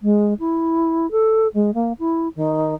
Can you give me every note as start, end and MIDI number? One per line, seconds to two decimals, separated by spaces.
0.02 0.34 56
0.39 1.09 64
1.11 1.48 69
1.54 1.71 56
1.74 1.93 58
1.99 2.28 64
2.36 2.74 51